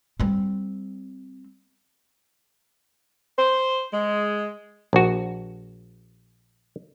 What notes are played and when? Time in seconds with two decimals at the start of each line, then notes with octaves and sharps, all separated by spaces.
0.20 G3 C4
3.39 C5
3.92 G#3
4.93 A#1 F#4